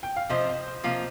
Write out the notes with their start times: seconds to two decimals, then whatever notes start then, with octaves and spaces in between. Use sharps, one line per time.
0.03 G5
0.16 F5
0.29 C3 F3 C4 F4 C5 D#5
0.84 C3 F3 A#3 F4